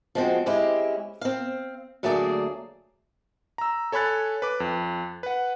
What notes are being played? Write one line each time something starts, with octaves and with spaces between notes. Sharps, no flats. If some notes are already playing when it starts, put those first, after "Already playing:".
F3 G#3 C4 F#4
G#3 C4 C#4 E4 G4
C4 F5
D2 F#3 A3 A#3 G#4 D5
A#5 E6
A4 C#5 G#5 B5 F#6 A6
B4 D6
F2
B4 F#5